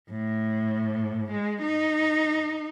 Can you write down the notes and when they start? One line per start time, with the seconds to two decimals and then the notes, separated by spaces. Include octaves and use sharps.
0.11 A2
1.32 G#3
1.62 D#4